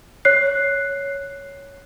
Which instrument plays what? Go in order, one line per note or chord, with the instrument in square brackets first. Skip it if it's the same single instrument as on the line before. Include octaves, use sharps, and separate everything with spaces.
[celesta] C#5 F#6 C7